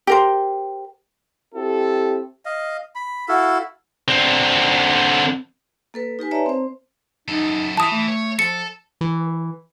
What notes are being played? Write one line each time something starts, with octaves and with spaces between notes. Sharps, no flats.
G4 A#4 C5
C4 E4 G4 A4
D#5 F5
B5
E4 F#4 A4 F5
D3 C4
A#3 A4 B4
D#4 G4 B4 G#5
C#5 D5 E5 A5 A#5
C4 C5
F#2 D#4 A4
E3 E4 A5 D#6
A3
C#5
F3 A4 C#7
E3